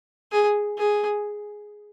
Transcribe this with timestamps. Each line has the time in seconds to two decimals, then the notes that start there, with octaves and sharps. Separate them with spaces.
0.32 G#4
0.78 G#4